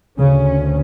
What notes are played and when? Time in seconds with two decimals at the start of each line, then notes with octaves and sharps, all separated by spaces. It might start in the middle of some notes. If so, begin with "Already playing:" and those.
0.19 D2 C#3 C#4